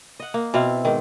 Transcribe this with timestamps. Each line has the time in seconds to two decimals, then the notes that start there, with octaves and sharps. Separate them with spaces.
0.20 D#5 F#5
0.34 A#3
0.54 B2 C4 E4 F5
0.85 G#2 D#3